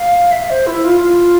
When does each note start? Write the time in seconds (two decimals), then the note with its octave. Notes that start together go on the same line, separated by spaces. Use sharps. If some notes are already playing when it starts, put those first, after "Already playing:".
Already playing: F5
0.31 E5
0.50 C5
0.67 E4
0.84 F4
1.01 F4